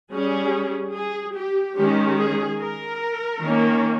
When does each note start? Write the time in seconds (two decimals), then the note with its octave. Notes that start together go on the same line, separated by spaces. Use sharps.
0.12 G3 C#4 G#4
0.95 G#4
1.36 G4
1.77 D#3 G#3 C#4 G4
2.19 G#4
2.61 A#4
3.43 D#3 A#3 C#4